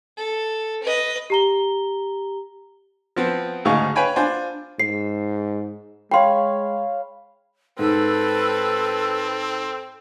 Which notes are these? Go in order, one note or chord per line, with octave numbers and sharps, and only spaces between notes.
A4
B4 D#5
G4 A#5 G7
F3 B3 C4
D2 G#2 C#3 D#4 F5 C#6
B4 C#5 F5 G5 G#5 B5
D4 F4 C5 G#5
G#2 E6 C7
G#3 C#5 F5 G5 B5 C6
G#2 C4 A4 B4